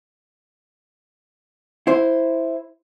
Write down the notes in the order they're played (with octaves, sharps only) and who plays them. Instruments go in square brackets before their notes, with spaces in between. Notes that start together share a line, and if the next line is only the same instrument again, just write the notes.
[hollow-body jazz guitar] E4 C5